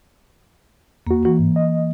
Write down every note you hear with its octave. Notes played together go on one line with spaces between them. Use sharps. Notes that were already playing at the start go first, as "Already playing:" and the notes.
E2 A#3 F#4
E3 F#4
G#2
D#5